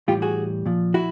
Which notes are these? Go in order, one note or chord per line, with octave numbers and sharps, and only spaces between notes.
A2 E3 G3 F4 G4
F#4 G#4
A#2 F3
E4 F#4